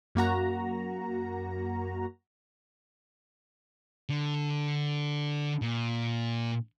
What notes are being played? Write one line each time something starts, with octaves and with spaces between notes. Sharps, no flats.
F#2 A#3 F#4 A#5
D3
A#2